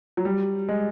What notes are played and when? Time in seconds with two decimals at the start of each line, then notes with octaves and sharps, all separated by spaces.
0.17 F#3
0.25 G3
0.69 G#3